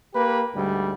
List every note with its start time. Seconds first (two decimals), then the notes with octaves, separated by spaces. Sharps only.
0.14 A#3 G4 B4
0.54 D2 G#2 G3